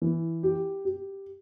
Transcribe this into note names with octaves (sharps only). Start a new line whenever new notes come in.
E3
G4
G4